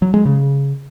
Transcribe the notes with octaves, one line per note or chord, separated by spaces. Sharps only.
F#3
G#3
C#3